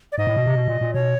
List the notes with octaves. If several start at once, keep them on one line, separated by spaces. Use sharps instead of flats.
D5
G#2 D#5
A2
B2
C3
B2
A#2
A#2
B2 C#5